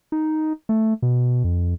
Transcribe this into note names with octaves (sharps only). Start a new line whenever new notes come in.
D#4
A3
B2
F2